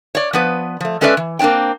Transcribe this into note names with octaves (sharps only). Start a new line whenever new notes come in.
C#5 D5
F3 B3 B4
F3 A3
G#3 C#4 A4 B4 D5 E5
E3
A#3 C4 D4 C#5 G5